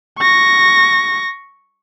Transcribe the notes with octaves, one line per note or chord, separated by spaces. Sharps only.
C#6 A#6